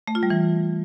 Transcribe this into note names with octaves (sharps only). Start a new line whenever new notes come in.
A3
F4
G3
E3